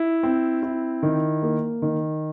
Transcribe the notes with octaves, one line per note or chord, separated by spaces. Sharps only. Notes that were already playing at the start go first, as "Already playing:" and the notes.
Already playing: E4
C4
E4
D#3
A#3
D#3